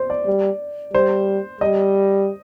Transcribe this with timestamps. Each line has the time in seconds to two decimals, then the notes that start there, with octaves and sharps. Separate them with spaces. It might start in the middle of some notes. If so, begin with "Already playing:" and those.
Already playing: C5
0.10 D5
0.27 G3
0.93 G3 C5
1.61 G3 D#5